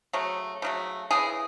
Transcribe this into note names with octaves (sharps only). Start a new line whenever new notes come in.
C#3 F#3 A3
C#3 F#3 A3
C#3 E3 G#3 G#4